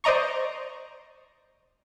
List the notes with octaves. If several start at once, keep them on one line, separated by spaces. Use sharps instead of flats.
C5 D5 D#5 A#5 C#6